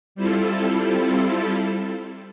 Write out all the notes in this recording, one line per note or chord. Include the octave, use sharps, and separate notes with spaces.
G3 C4 E4 F4 A4